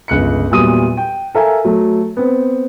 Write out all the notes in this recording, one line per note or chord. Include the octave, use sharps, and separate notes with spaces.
G1 C#2 F#6 C#7
E2 A#2 F#3 G3 D#6 D#7
G5
A4 A#4 E5 F5 G#5
F#3 A3
B3 C4